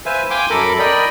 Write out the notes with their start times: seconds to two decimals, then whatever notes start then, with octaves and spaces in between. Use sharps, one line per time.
0.06 B4 C5 E5 F5 G#5
0.30 F5 G5 G#5 C6 D6
0.50 F#2 A4 A#4 B5 D6
0.79 A#4 D5 D#5 G5 B5